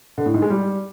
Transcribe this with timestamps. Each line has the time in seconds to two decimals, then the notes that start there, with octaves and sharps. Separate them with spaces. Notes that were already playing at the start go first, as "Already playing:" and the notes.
0.18 D3
0.26 A2
0.34 G#2
0.42 G#3
0.50 G3